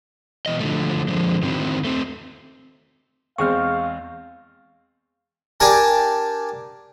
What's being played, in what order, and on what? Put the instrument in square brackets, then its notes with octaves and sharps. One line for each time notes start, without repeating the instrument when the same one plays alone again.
[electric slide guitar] B2 E3 D#5
D3 F3 A3
D3 F3 G#3
D3 D#3 C4 C#4 E4 F#4
A3 C4
[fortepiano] E2 G#3 C4 [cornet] F5 [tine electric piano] C#6 F6
[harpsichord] D4 G4 A#4 G#5 A5